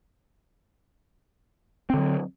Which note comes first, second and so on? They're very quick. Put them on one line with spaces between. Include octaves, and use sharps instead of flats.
C4 D3 F#3